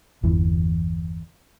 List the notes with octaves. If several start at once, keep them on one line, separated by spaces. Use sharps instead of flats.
G1 E2 E3